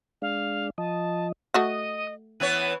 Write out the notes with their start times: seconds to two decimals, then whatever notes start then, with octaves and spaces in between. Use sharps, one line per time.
0.22 G#3 D4 F5
0.78 F3 D#5 A5
1.54 A3 F#4 D#5 F#5 D#6
2.40 E3 B3 C#5 F#6 D#7